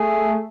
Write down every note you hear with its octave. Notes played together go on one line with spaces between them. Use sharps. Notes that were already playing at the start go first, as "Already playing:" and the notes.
Already playing: A3 G#4